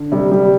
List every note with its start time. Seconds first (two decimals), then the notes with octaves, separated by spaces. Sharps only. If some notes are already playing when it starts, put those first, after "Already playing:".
Already playing: D3
0.12 C3 G3
0.32 G3